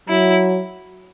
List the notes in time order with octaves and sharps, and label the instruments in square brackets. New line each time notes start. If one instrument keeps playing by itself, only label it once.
[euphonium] F#3 [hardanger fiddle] E4